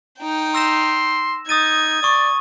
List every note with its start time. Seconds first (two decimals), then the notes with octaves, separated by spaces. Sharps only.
0.20 D#4 G5
0.55 C6 E6 A#6 E7
1.49 D#4 D#6 G#6 A6 D#7
2.03 D5 C#6 D#6